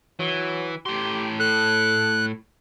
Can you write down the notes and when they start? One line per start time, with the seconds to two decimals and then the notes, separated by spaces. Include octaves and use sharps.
0.19 E3 F#3
0.86 A2 G4 C6
1.40 A4 F#6